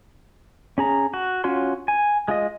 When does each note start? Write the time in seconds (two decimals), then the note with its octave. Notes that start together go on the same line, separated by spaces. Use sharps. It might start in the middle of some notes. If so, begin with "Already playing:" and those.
0.78 C#4 G#4 A#5
1.14 F#4
1.44 C#4 F4 F#4 C#5 C6
1.88 G#5
2.28 G#3 F4 D#5